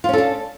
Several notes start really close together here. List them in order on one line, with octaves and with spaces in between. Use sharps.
F4 C#4 A4 D4